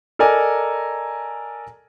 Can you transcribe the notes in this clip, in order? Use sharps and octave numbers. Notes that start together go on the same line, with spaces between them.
A4 A#4 D5 D#5 G#5 A#5